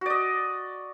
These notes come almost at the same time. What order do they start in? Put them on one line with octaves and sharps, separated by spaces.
F#4 D5 D#5